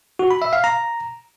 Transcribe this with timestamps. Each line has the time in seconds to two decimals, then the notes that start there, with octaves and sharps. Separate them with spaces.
0.19 F#4
0.31 B5
0.42 E5
0.53 F5
0.64 A#5